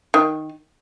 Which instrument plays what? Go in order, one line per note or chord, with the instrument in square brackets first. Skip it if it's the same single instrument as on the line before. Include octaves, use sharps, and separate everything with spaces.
[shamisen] D#3